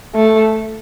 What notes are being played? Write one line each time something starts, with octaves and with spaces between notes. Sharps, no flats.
A3